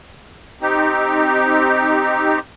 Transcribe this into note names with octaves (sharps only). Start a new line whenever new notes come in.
C4 D#4 G4